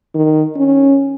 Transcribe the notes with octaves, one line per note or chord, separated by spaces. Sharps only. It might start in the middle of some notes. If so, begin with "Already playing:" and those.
D#3
C#4